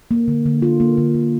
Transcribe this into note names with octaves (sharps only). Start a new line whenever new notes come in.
A#3
D3
D3
F4
A#3
D3
D3